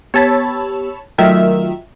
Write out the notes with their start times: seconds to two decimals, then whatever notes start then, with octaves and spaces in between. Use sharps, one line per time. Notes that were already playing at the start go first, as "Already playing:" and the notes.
0.14 B3 G4 C#5 A5 B5 E6
1.18 D#3 F#3 A3 F4 E5 F6